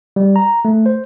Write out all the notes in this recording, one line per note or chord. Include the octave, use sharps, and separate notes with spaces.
G3
A#5
A3
C5